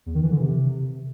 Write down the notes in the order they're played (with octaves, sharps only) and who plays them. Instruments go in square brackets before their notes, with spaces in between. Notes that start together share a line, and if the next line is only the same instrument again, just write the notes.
[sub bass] E2
D#3
E3
D3
C3